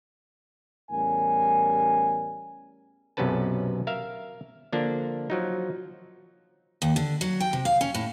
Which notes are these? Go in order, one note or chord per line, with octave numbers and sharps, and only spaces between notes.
E2 A2 G3 C#4 A#4 G#5
B1 F#2 C3 C#4 B4 A5
A#4 E5 F5
D3 F3 A#3 D4
F3 F#3 D#4
D#2
D3
F#3
G5
C3
F5
C#4
A2